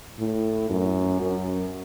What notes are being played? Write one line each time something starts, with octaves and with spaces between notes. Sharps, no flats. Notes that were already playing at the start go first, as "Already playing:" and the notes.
A2
F#2
F#2